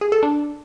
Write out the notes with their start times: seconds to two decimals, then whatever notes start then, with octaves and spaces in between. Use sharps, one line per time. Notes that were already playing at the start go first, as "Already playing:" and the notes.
0.01 G#4
0.12 A4
0.23 D4